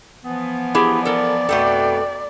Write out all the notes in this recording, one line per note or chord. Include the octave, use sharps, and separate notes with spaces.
E3 F3 B3
E4 G4 G#4
A4 A#4 D5
F2 B2 A3 B3 A4 G5